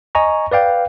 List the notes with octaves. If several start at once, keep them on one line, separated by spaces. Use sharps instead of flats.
D#5 G#5 A#5 C#6
B4 D5 F5 G5